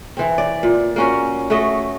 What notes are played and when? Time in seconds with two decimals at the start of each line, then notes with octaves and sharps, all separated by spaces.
0.17 E3 C4
0.38 D5
0.63 A#2
0.96 A#3 C#4 F#4
1.50 A3 F#4 A4 D#5